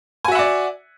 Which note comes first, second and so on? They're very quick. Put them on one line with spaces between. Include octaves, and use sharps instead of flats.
G#5 F#4 E5 F#5 D5